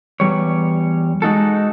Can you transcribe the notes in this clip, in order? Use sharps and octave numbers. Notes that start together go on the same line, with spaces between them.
E2 G2 G3 C#5
G#3 D#4 F#4 A4